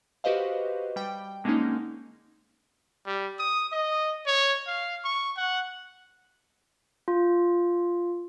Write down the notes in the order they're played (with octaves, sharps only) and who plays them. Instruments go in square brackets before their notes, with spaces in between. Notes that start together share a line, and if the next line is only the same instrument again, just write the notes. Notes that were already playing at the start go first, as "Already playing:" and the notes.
[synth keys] F#4 G4 B4 C5 D#5 F5
G3 G5
D3 G#3 A#3 C4 C#4 D#4
[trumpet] G3
D#6
D#5
C#5
F5
C#6
F#5
[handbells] F4